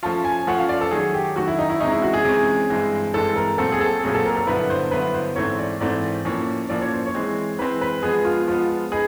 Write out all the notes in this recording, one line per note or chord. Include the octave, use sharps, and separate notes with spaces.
F3 A3 C#4 F4 A5
G#5
F3 A3 C#4 F4 F#5
F5
D5
A4
D#3 F#3 A3 G#4
G4
D#3 F#3 A3 F#4
E4
D#4
E4
C3 E3 G#3 C#4 D#4
E4
F#4
G#4
C3 E3 G#3 C#4
G2 E3 G#3 C4
G2 E3 G#3 C4 A4
A#4
A#2 F#3 A3 C4 A4
G#4
A4
A#2 F#3 A3 C4 G#4
A4
A#4
A#4
G2 D3 F#3 B3 E4 B4
C5
G2 D3 F#3 B3 E4 B4
C5
G#2 E3 A3 C4 C#5
D5
G#2 E3 A3 C4 D5
A2 F3 A#3 C#4
A2 F3 A#3 C#4 D5
C#5
C5
C#5
E3 G#3 C4
E3 G#3 C4 B4
B4
F3 G#3 B3 G#4
F4
F3 G#3 B3 F4
D#4 G#4 B4